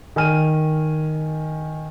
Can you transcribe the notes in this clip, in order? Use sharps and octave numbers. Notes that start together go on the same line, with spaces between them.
D#3 G#5 F6 D#7